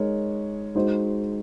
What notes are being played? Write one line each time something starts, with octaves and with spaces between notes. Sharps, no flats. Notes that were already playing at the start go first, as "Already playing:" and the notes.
Already playing: G#3 D#4 A#4 C#5
G#3 D#4 F#4 C5